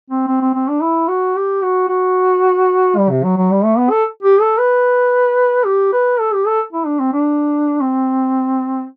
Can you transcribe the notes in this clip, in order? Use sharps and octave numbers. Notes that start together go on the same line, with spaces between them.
C4
C4
C4
C4
D4
E4
F#4
G4
F#4
F#4
G3
C3
F#3
F#3
G3
A3
B3
A4
G4
A4
B4
G4
B4
A4
G4
A4
E4
D4
C4
D4
C4